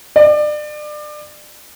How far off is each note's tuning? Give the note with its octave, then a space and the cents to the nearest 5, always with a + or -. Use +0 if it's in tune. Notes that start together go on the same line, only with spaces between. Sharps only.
D5 +30